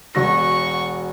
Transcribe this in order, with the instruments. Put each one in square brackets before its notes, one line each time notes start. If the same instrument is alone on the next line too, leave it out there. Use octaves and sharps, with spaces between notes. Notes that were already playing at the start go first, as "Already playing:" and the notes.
[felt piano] E1 F#4 A#6 [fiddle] C#6